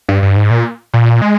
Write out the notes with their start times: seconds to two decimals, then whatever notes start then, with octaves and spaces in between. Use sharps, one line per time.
0.09 G2
0.22 G2
0.37 G#2
0.50 A#2
0.94 A#2
1.22 G#3